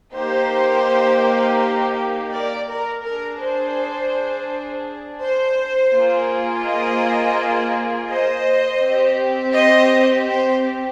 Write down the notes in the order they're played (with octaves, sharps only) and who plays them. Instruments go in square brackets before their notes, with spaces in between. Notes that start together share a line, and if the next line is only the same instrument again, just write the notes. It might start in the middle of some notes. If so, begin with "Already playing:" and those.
[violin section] A#3 D#4 G4 C5
A#4 D5
A#4
D4 G#4 A#4
C5
C5
A#3 F4 G#4
C5 D#5
C5 D#5
C4 G4
C5 D#5
C5